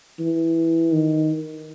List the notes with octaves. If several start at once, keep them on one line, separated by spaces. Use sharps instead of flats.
E3
D#3